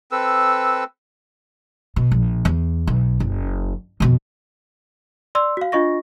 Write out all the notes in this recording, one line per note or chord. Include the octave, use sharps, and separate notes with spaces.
C4 A4 B4 E6
B2
A#1
E2
B1
F#1
F2 B2
D5 C6 E6
F#4 F5
D4 F4 D#5 C#6 A#6